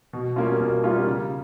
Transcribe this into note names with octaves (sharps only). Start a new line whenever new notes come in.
B2
G3 A#3 C#4 F4
B2
G3 A#3 C#4 F4
C#3